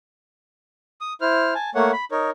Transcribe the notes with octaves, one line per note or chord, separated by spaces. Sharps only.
D#6
E4 C5 F6
G#5 A5
A3 A#3 C#5 F#5
B5
D#4 A#4 C#5